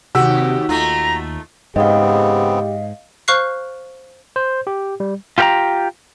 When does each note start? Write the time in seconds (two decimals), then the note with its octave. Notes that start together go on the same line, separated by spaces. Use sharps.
0.15 D#2 C3 F#4 G4 E6
0.69 D#2 A3 D#4 F4 A#5
1.76 G#2 C#3 B3 C4 G4 D#5 F5
3.28 C5 F5 C#6 F6 F#6 C7
4.36 C5
4.67 G4
5.00 G3
5.38 F4 G4 A#4 F5 G5 A#5